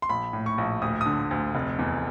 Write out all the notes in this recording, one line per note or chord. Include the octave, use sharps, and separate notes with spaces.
C6
A#1 B5
A2
C#6
A#1
D2 D#6
D3 D#6
D2
F1
E2